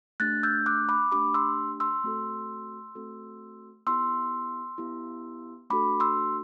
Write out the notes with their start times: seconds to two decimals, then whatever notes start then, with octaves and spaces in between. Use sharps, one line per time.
0.20 A3 D4 G4 F#6 A6
0.43 E6 G6
0.66 D6 F#6
0.89 B5 D6
1.12 A3 D4 G4 B5 D6
1.34 C6 E6
1.80 C6 E6
2.04 A3 C4 F#4 A4
2.95 A3 C4 F#4 A4
3.87 B3 E4 G4 C6 E6
4.78 B3 E4 G4
5.70 A3 D4 F#4 A4 B5 D6
6.00 C6 E6